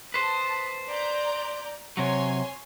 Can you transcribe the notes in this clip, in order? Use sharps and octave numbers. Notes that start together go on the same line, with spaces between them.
B4 C5 A5 D#6
D5 A#5 G6
C3 F#3 C#5 G#5 C6